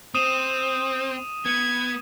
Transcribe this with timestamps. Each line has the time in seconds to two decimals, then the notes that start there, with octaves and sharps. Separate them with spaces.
0.15 C4 D#6 D#7 E7
1.46 B3 G#6